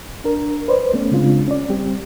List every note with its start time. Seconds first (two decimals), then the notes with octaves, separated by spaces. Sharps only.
0.24 D4 A#4
0.68 B4 C5 D5
0.94 A3 B3 C#4
1.12 C#3 G#3 C4 D4 F4
1.48 C#4 D5
1.69 G3 C4 G4